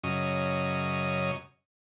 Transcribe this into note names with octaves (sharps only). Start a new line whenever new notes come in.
F#2 C#3 D#5